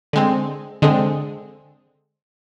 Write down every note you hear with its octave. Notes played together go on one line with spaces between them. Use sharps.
D3 G#3 C4
D3 G#3 C4